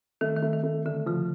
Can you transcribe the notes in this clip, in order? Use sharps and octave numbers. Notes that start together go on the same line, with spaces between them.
D#3 A3
D#3
A3
D#3
A3
D3 A3
C#3 F3